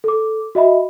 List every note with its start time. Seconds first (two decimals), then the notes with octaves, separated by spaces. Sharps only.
0.04 A4 D6
0.55 F#4 D#5 E5 B5